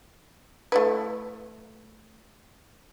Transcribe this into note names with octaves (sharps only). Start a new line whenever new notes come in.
A3 E4 B4